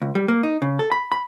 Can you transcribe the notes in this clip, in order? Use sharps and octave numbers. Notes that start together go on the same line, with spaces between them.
C#2
G3
A#3
D#4
C#3
A4
B5
B5